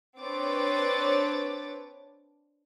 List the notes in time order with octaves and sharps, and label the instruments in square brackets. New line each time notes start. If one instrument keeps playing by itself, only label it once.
[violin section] C4 D4 B4 C#5 D6 A6